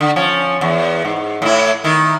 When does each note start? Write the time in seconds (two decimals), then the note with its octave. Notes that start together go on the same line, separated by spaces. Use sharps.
0.01 D3
0.16 F3 C#4
0.61 E2
1.05 G#2
1.42 A2 E4
1.84 D#3 E4